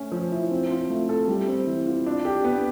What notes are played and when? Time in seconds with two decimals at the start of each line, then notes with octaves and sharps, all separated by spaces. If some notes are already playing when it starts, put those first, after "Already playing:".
Already playing: A3 C#4
0.12 F3
0.31 E4
0.51 C4
0.70 F4
0.90 A3
1.09 A4
1.28 G3
1.48 C4
1.67 E3
1.86 F4
2.06 D4
2.25 G4
2.44 B3